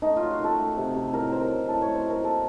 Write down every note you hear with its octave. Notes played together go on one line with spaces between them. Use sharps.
A3 D#4
F4
F#3
F#4
D#3 A4
A3
C3
C3
A2 A#4
F#3 C5
A#4
F#3
A2 A4
A3 C#5
C5
A3 A#4
A#3 A4